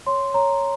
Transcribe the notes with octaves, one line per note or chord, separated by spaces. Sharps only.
C#5 C6
C#5 A#5